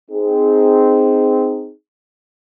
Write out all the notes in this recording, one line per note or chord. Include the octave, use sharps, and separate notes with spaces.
C4 D#4 G#4